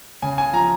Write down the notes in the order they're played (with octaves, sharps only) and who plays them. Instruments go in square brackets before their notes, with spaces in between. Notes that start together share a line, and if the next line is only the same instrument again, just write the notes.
[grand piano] C#3 G#5
G#5
F3 A#5